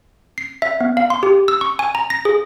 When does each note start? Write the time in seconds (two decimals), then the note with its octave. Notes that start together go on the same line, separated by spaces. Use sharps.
0.38 C7
0.62 E5
0.81 B3
0.97 F5
1.10 C6
1.23 G4
1.48 E6
1.61 C#6
1.79 G#5
1.95 A#5
2.10 A#6
2.25 G#4